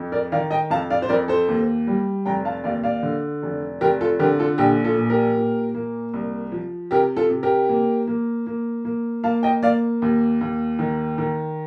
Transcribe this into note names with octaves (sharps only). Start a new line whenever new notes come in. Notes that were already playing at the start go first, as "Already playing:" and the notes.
Already playing: F2
A#4 D5
D#3 D5 F5
D#5 G5
F2 F5 A5
D5 F5
C5
F2 A#4 D5
A4 C5
D#2
G3
F1 G5 A#5
F5 A5
D#2 D5 F5
D5 F5
D3
F1
F1 G4 A#4
F4 A4
D3 G4 A#4
F4 A4
A#1 G4
F4 A4
A#2
G4 A#4
A#2
A#3
C2
F3
C3 G4 A#4
F4 A4
C3
G4 A#4
A#3
A#3
A#3
A#3
A#3 F5 A5
D#5 G5
A#3 D5 F5
D#2
D#2
D#3
D#3